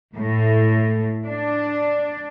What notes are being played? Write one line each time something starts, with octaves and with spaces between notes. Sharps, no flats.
A2
D4